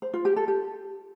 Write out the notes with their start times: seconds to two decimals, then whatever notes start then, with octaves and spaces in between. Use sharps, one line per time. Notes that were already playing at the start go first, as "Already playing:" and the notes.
0.02 C5
0.14 F4
0.25 G4
0.36 A4
0.48 G4